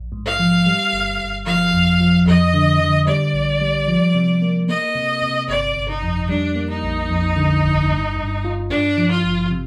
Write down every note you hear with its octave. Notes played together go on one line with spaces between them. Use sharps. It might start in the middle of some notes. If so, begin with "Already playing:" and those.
Already playing: A#1
G#2
F5
F3
G3
G1
G1
F3 F5
F2
F3
F2 D#5
D3
D3
G3 D5
A#1
G3
F3
C3
A#3
A#3 D#5
C3
C3
G1 D5
G1
D#4
F2
G3 D4
A#3
D#4
A#1
F2
D3
G1
G2
G2
F4
G2 D4
F3
F4
G#1
C3